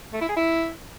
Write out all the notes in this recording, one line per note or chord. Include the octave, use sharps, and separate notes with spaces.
A3
E4
G#4
E4